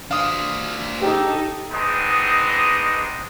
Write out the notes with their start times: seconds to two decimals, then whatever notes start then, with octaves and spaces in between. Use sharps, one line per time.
0.11 D4 C5 F5 D#6
1.02 D#4 G4 A4
1.72 G#3 B3 C4 D4 D#4 D#5